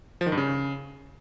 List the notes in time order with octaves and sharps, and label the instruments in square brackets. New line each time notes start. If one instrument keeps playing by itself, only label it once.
[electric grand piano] F3
D#3
G2
C#3